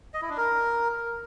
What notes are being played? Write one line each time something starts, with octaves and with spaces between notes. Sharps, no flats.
D#5
E4
D4
A#4